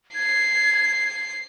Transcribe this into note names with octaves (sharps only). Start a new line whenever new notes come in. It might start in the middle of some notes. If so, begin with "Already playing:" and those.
G#6 C7